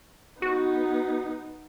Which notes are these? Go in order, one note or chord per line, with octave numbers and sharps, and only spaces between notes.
B3 D#4 F#4